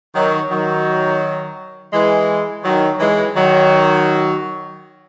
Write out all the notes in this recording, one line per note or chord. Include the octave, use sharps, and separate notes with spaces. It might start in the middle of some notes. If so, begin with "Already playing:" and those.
D#3 F#3
D#3 F#3
E3 G#3
D#3 F#3
E3 G#3
D#3 F#3